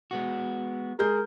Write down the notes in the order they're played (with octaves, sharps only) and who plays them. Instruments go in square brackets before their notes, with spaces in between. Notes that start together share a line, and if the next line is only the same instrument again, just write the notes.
[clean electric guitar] G#3 B3 F#4
[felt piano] G#3 G#4 G6 [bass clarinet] A#4